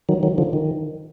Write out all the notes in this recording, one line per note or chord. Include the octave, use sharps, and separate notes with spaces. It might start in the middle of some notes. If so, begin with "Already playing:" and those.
D#3 F#3
D#3 F#3
D3 F3
D#3